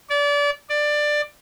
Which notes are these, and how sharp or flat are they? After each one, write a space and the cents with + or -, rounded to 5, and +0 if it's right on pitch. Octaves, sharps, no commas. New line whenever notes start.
D5 -30
D5 +15